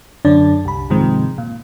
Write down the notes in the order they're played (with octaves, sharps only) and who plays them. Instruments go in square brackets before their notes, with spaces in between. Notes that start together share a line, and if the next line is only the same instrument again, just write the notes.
[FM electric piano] F#2 D3 D4 D5
C2 B5
G#2 C3 D#3 F3 G#3 C4
A#2